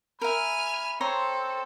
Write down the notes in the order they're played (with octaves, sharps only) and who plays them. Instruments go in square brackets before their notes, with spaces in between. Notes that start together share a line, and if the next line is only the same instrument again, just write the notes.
[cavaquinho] A#4 E5 [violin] G#5 F6 [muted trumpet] B5
[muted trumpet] C4 [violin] A4 [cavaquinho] C#5 A#5 C6